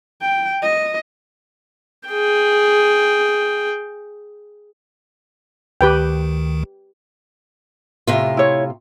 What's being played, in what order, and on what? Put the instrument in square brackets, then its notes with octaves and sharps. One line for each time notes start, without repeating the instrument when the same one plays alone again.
[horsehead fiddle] G5
D#5
[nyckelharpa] G#4 G5
[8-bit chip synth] D2 D#3 [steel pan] G4 B4 G5
[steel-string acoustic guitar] A2 C3 F4
[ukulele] E4 C#5